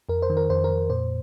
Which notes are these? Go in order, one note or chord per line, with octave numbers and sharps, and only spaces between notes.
F2 A#4
C5
D#3
A#4
F2 C5
A#4
F2
A#2 C5